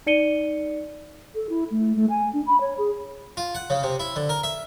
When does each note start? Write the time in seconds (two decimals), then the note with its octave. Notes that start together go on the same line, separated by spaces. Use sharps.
0.06 D#4 D5 C#7 D#7 G7
1.35 A4
1.49 E4
1.71 A3
1.96 A3
2.10 G#5
2.33 D4
2.46 B5
2.61 C#5
2.78 G#4
3.37 F4
3.55 F#5
3.70 C#3
3.83 C3
4.00 E4
4.16 D3
4.29 A#4
4.43 E5